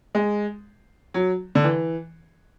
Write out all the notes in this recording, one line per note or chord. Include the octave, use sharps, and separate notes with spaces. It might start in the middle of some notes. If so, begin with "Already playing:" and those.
G#3
F#3
D3
E3